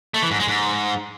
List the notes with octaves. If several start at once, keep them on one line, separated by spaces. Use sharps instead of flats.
A3
E3
G#2
G#3
G#2